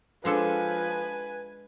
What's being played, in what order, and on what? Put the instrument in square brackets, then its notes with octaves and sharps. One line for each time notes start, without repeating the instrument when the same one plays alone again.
[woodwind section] F3 [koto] G#3 D4 A4 [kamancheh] B4 G#5